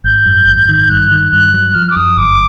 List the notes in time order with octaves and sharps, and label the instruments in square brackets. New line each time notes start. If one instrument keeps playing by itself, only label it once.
[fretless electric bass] G#1 [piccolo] G6
[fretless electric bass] F#2
G#1
D#3
[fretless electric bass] G2 [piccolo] F#6
[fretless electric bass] D#3
[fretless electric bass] G2 [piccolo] F#6
[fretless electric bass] F#3
[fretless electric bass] F3 [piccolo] F6
[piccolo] D6
[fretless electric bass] F#2 [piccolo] D#6
[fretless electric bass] G1 [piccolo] D6